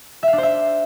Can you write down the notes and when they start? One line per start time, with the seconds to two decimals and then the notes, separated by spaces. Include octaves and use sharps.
0.23 E5
0.28 F5
0.33 D4
0.38 C5
0.43 E5